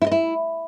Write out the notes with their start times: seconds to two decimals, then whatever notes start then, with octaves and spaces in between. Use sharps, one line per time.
0.02 E4
0.07 D#5
0.12 E4